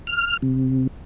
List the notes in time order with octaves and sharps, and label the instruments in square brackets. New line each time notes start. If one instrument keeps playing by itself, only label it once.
[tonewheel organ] F6
C3